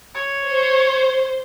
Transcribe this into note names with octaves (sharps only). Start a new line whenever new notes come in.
C#5
C5